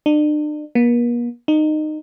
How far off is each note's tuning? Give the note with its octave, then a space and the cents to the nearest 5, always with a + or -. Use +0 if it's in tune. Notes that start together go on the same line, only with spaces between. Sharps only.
D4 +40
A#3 +45
D#4 -20